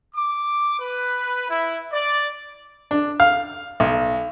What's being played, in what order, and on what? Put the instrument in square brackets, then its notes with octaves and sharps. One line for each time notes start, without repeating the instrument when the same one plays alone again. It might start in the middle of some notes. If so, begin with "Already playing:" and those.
[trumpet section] D6
B4
E4
D5
[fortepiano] D4
F5
B1